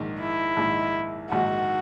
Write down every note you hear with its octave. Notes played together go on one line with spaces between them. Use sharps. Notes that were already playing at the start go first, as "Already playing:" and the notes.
Already playing: A#1 G#2 D#3
E4
A#1 G#2 D#3
A#1 G#2 D#3 F#4